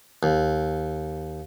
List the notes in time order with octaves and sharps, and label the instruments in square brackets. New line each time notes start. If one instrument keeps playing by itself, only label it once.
[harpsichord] D#2